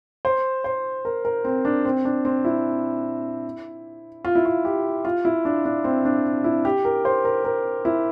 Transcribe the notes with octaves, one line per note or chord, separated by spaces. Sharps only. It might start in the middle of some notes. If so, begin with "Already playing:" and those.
C5
C5
A#4
A#4
C4
D4
C4
D4
C4
E4
F4
E4
F4
G4
F4
E4
D4
D4
C4
D4
E4
G4
A#4
C5
A#4
A#4
E4